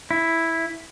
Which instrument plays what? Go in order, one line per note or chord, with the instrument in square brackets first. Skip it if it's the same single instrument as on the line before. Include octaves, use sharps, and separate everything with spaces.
[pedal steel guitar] E4